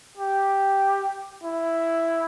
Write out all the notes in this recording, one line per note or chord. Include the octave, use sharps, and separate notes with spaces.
G4
E4